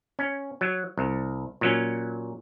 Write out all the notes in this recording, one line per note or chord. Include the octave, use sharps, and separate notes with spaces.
C#4
F#3
C2
A#2 F#3 C#4